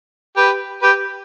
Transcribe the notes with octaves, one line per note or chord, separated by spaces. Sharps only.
G4 B4
G4 B4